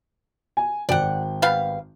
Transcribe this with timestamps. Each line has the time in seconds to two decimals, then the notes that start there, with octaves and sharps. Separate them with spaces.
0.57 G#5
0.89 G#1 D5 F#5 G5
1.42 G3 B3 F5